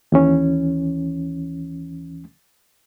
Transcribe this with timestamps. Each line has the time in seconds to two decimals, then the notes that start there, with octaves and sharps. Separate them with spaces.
0.12 D#2 E3 C#4